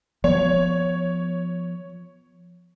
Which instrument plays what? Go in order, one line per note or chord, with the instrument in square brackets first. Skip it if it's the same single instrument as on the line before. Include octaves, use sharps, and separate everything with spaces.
[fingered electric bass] F3 B3 [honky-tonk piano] C#5